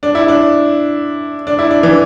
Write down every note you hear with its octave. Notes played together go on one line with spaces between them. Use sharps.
D4
E4
D4
D4
E4
D4
E3